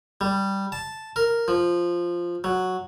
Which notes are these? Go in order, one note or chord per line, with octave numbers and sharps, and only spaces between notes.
G3
A5
A#4
F3
F#3